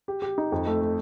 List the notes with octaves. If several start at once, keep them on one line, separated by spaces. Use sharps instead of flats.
G4
G4
D#4
F2
A3
A3